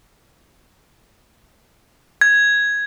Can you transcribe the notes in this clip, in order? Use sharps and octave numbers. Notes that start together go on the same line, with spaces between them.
G#6